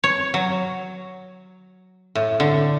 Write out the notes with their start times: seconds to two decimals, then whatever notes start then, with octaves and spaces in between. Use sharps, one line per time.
0.04 C#5
0.34 F#3
2.15 A2
2.40 D3